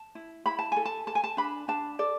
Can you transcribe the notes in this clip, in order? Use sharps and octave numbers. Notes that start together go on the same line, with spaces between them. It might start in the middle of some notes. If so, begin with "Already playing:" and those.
Already playing: A5
E4
E4 B5
A5
A4 G#5
A5
A4 A5
G#5
A5
D4 B5
D4 A5
A4 D5